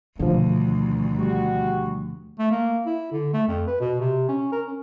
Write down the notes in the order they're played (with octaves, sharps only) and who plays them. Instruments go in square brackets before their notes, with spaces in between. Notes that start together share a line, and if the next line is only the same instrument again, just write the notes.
[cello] D2 [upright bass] B2 D#3 [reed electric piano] D3 F3
[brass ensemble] G3 F#4
[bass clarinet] A3
A#3
E4
D3
A3
F2
B4
B2
C3
C#4
A#4
C#4